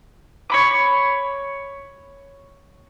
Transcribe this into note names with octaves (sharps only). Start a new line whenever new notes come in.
C#5 B5 D6